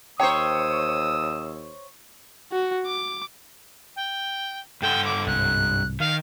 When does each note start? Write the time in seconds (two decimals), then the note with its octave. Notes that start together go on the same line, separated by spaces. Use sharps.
0.20 D#2 C5 C#5 G5 A#5 D#6 E6
2.52 F#4
2.86 D6
3.96 G5
4.82 G2 A4 F#5 G5
5.05 D6
5.27 C2 G#2 F#6
6.00 D#3 F5